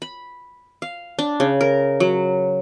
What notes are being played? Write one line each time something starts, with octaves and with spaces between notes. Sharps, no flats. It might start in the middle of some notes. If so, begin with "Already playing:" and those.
B5
F5
D4
C#3
A#4
F#3